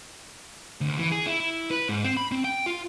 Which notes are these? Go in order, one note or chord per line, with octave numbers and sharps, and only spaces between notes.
D2
E3
G#4
E4
E4
B4
G#2
C4
B5
C4
G5
F4